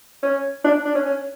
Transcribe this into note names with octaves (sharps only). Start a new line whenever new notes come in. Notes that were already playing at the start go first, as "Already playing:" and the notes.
C#4
D4
D4
C#4
C#4